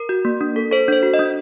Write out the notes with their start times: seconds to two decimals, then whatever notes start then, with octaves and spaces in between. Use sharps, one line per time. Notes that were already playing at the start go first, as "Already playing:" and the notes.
Already playing: A#4
0.09 F#4
0.25 A#3
0.41 D4
0.56 A4
0.71 A4 C5
0.88 D4 C5
1.03 F#4
1.14 D#5
1.19 D4